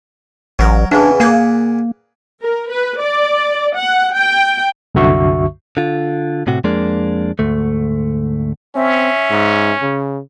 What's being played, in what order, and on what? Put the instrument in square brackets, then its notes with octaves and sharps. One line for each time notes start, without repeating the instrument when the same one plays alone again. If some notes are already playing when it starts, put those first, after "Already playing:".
[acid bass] A1 [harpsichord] F#3 A#4
[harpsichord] E2 C#3 E3 [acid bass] D4
[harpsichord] A#2 G#4 F#5 [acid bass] A#3
[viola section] A#4
B4
D5
F#5
G5
[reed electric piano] C2 F#2 D3 F#4 E5 C#6
[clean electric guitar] D3 F4
A2 C3 F#4
F2 G#3 A#3 D4
D2 G#2 A3
[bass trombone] C4 [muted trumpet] C#4 [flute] E5
[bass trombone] G#2
C#3